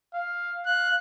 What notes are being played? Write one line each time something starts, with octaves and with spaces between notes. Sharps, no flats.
F5
F5 F#6